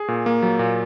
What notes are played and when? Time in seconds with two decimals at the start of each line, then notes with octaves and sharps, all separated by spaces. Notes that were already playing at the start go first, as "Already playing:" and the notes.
Already playing: G#4
0.08 A#2
0.26 A#3
0.43 F#3
0.59 A#2